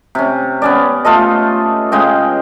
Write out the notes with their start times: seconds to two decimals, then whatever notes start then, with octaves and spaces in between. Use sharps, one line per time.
0.15 C3 C#4
0.62 B3 C#4 D5
1.05 A3 F4 A4 D#5
1.92 C#3 G#3 D#5 G5